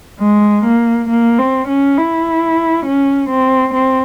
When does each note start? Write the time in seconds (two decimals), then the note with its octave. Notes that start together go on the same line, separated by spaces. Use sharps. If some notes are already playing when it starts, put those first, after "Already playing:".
0.20 G#3
0.65 A#3
1.09 A#3
1.39 C4
1.68 C#4
1.97 E4
2.86 C#4
3.30 C4
3.74 C4